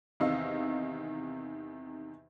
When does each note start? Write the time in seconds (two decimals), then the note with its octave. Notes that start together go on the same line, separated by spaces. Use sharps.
0.20 E2 C3 D#3 D#5 F5 E6